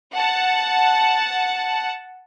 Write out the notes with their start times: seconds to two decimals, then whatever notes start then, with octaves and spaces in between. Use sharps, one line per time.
0.14 F#5 A5